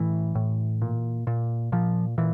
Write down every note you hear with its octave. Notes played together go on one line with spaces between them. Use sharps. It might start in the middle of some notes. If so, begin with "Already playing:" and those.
Already playing: A2 E3
A2
A#2
A#2
A#2 F3
A#2 E3